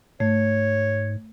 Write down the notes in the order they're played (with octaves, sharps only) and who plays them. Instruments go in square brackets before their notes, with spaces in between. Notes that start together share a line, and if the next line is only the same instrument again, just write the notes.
[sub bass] G#2 [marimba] A3 [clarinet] C#5